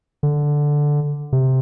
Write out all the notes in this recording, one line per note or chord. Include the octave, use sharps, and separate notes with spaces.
D3
C3